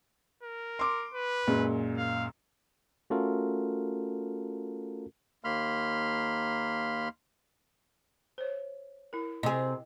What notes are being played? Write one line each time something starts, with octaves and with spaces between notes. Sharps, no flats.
A#4
C6 D6
B4
F#2 A#2 G#3
F5
A3 C#4 F4 F#4 A4 A#4
D#2 A#3 B5 C6 F6
C5 C#5
E4 A#4
C3 G#4 D#5